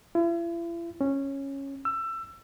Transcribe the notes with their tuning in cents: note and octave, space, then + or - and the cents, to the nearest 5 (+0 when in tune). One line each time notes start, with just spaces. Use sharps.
E4 +45
C#4 -10
E6 +20